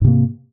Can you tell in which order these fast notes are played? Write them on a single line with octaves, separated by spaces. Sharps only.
G#2 C3 A#3